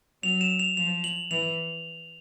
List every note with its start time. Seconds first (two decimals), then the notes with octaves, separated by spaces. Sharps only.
0.23 F#3 F7
0.41 E7
0.59 F7
0.77 F3 F7
1.04 F#7
1.31 E3 F7